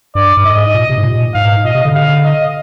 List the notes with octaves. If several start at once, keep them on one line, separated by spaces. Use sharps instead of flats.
G2 D5
G2
G#2 D#5
A#2
C3
G#2
A#2
G#2 F5
A#2 D#5
C3
D3
F5
D#5